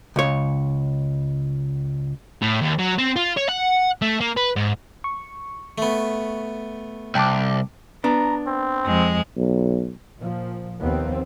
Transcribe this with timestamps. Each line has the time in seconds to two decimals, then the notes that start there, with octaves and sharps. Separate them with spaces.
0.16 C#2 C#5
2.42 A2
2.61 D#2
2.79 F#3
2.98 C4
3.16 F4
3.37 C#5
3.49 F#5
4.02 A3
4.21 A#3
4.37 B4
4.56 G#2
5.04 C#6
5.78 A3 B3
7.15 C2 G5 A5 D6
8.04 B3 D4 A#5
8.47 C4
8.86 F2 G#3
9.37 B1
10.19 A#2 F3
10.81 D#2 C3 F3 B3 C4